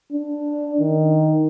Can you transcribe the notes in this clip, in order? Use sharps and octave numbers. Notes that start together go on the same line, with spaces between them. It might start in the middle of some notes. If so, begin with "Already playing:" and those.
D4
D#3